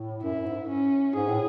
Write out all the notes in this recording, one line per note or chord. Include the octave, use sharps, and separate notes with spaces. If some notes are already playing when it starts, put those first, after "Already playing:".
Already playing: A2
F#2 E4
F#2
G#2
C#4
G#2 G#4
A2